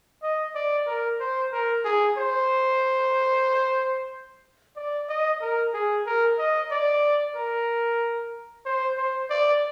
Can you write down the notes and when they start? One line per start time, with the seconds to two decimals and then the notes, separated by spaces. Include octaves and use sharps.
0.23 D#5
0.55 D5
0.87 A#4
1.20 C5
1.52 A#4
1.85 G#4
2.17 C5
4.76 D5
5.09 D#5
5.41 A#4
5.74 G#4
6.06 A#4
6.39 D#5
6.71 D5
7.36 A#4
8.66 C5
8.97 C5
9.30 D5